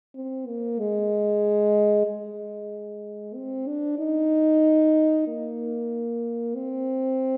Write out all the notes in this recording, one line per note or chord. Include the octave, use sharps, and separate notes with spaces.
C4
A#3
G#3
G#3
C4
D4
D#4
A#3
C4